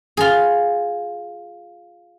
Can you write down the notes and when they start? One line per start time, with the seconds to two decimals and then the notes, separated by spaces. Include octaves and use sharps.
0.17 F4 G#4